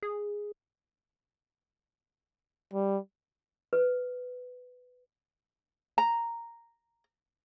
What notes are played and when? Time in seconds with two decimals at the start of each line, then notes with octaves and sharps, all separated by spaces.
0.03 G#4
2.73 G3
3.73 B4
5.98 A#5